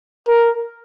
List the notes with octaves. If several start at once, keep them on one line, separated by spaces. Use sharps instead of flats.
A#4